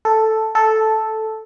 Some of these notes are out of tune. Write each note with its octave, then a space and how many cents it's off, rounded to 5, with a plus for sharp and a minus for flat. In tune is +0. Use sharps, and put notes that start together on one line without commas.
A4 +0
A4 -5